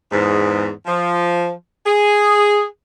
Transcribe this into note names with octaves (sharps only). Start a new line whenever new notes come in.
E2 G#2
F3
G#4